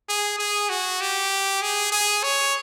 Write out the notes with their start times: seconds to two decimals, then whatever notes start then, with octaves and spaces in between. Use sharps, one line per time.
0.09 G#4
0.39 G#4
0.69 F#4
1.01 G4
1.62 G#4
1.92 G#4
2.23 C#5